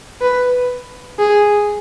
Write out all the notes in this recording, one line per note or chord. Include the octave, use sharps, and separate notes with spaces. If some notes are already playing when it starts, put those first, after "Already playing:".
B4
G#4